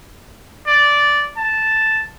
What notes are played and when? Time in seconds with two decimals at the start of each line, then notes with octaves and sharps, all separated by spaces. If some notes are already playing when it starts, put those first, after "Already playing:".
0.67 D5
1.37 A5